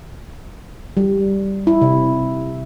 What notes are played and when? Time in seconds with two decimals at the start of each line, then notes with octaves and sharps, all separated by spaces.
0.97 G3
1.67 E4
1.81 C3